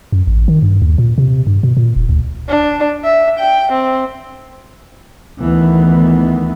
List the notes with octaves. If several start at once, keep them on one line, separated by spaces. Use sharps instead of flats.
F#2
A1
D#3
G2
D#2
A#2
C3
G2
B2
A#2
E1
D2
D4
E5
G5
C4
D2 D#3 E3 B3